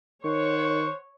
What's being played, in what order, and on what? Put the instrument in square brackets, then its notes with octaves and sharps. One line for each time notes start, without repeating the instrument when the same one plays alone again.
[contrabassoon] D#3 [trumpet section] C5 F#5 C#6 [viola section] C#5